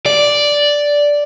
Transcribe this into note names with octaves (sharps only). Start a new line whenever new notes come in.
D5